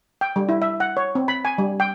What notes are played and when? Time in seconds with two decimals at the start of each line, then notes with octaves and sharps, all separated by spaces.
0.21 G5
0.36 G3
0.49 E4
0.62 E5
0.80 F#5
0.97 C#5
1.15 C4
1.28 B5
1.45 G#5
1.58 G3
1.80 G5